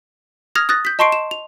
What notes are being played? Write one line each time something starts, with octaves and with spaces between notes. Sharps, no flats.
D#6 F6 G#6 A#6 F7
D#6 F#6 A6 A#6
G6 B6
D#5 A5 C6 C#6 C7 D7
E7
F7